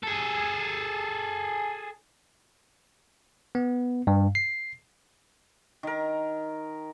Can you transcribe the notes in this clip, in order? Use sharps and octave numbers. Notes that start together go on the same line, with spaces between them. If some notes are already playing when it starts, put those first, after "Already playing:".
G#4 A4
B3
G2
C7
D#3 A#4